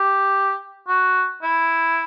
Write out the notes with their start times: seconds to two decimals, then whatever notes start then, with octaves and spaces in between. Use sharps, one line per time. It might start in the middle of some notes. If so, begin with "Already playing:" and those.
Already playing: G4
0.88 F#4
1.42 E4